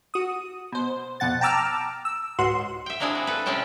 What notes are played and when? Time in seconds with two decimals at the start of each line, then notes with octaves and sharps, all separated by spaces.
0.14 F#4 D#6
0.72 B2 C5
1.20 F2 B2 F#5 A6
1.41 G5 A5 A#5 D6 E6 F6
2.05 E6
2.39 C#2 G#2 F#4 C6
2.86 E5 G5
3.00 A#3 C4 D4 E4 G#4
3.15 F#4
3.27 A4 B4
3.46 C3 G#3 C4 C#4 G5 A5